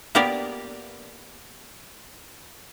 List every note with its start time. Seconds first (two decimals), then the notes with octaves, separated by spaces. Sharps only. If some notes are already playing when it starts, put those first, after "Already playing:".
0.15 A#3 B3 F4 G4 A#4 D5